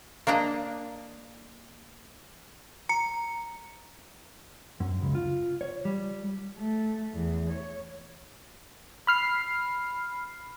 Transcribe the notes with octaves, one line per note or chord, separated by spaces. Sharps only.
A#3 D4 D#5 A#5
A#5 C#7
F#2
C#2
F4
C#5
G3
A3
E2
C#5
B5 F6 C7